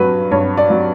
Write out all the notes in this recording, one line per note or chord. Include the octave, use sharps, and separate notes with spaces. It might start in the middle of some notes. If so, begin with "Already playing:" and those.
Already playing: G2 F#3 B4
G2 C#5
D5
F#3